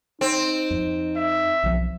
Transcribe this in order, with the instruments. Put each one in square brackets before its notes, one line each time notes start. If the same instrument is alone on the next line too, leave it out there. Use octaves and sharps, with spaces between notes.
[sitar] C4 [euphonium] D#4
[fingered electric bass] F2
[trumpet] E5
[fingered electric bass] B1 F3